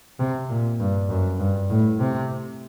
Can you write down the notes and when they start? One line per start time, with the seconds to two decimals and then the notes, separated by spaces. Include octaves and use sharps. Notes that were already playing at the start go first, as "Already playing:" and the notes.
0.19 C3
0.49 A#2
0.79 G2
1.09 F#2
1.39 G2
1.70 A2
2.00 C3